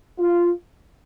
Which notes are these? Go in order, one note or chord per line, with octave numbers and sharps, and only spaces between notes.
F4